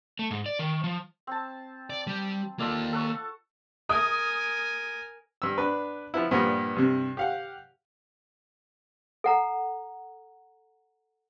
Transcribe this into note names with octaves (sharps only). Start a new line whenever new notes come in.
A3
G#2
D5
D#3
F3
C4 A5
D5
G3
A#3 F4 A4 D5 D#5
A4 F#5 C#6
A#4 G#5 D#6
G2 E6
B3 D4 B4
F3 B3 E4
G2 A#2 F3 B3
G2 C3
G4 F5 F#5
A4 F#5 A#5